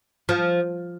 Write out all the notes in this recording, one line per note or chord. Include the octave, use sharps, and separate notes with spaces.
F3